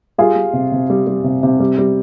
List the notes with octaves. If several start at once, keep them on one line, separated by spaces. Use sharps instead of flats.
G3 F4 G#4
G3
C3
C3
G3
G3
C3
C3
G3
G3